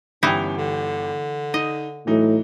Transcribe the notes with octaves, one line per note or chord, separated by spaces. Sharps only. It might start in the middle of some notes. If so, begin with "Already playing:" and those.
G1 E3 G3 C#4 D#4 E4 G5
D3
D#4 D#5
A2 E3 F#3 D#4